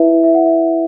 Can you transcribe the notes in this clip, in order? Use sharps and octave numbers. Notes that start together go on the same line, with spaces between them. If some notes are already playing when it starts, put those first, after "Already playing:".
Already playing: E4 B4 E5
E5
F#5
E5